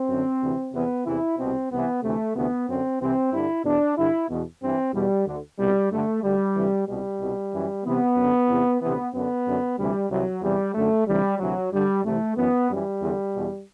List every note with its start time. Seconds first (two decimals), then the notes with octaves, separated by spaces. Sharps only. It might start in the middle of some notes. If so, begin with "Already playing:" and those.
Already playing: C4
0.08 F#2 D3
0.41 D2 C3 E3
0.73 E2 C3 E3 B3
1.05 E2 C3 E3 E4
1.38 C2 B2 C4
1.70 C2 C3 E3 B3
2.02 D2 C3 E3 A3
2.34 D2 C3 E3 B3
2.67 F#2 D3 C4
2.99 C2 C3 E3 C4
3.31 G2 D3 E4
3.64 E2 B2 D4
3.95 G2 D3 E4
4.28 E2 B2
4.60 G2 E3 C4
4.92 E2 B2 G3
5.26 D2 D3
5.57 C2 B2 G3
5.90 G2 D3 A3
6.22 D2 D3 G3
6.54 D2 C3 E3
6.86 C2 B2 G3
7.19 C2 B2
7.52 F#2 E3
7.84 C2 C3 E3 B3
8.16 F#2 D3
8.48 E2 C3 E3
8.80 D2 C3 E3 B3
9.12 F#2 D3 B3
9.45 F#2 D3
9.77 D2 C3 E3 G3
10.09 C2 C3 E3 F#3
10.42 E2 C3 E3 G3
10.74 F#2 D3 A3
11.06 D2 C3 E3 G3
11.38 D2 C3 E3 F#3
11.71 G2 D3 G3
12.03 C2 C3 E3 A3
12.35 F#2 E3 B3
12.68 F#2 E3 G3
13.00 E2 D3
13.33 E2 B2